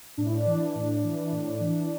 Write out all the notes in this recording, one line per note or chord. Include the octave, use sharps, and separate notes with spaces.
A2 D4
E4
D4
E3
A2
E3
A2
E3